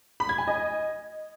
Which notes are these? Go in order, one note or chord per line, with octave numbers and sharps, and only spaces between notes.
B5
G#6
G#5
D#5